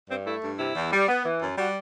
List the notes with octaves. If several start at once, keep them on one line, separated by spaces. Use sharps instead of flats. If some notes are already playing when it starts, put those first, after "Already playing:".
G2 C4
A3 E4
G2
C3 E4
E2
G3
B3
E3
F#2
G3 F#4